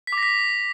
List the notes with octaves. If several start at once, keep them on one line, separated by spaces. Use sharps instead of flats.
B6
D6
A#6
B6